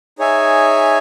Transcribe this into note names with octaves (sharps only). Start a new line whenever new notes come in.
D#4 G#4 C#5 E5 G#5